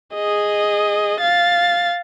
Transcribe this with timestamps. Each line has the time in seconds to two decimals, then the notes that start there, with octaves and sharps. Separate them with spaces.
0.14 G#4 D#5
1.21 F5 A6